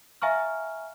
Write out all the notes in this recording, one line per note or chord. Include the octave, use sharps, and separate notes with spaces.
E5 F5 G#5 A#5 C#6 F6